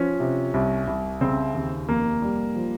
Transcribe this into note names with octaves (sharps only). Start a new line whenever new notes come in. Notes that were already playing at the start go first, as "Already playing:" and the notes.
Already playing: F3 C#4
C3
C2
C2
C#3 C4
D#2
F1 A#3
G3
F3